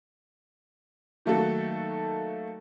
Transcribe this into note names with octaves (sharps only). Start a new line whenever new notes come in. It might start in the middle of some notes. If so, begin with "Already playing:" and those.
D#3 F#3 A3 A#3 F#4 A4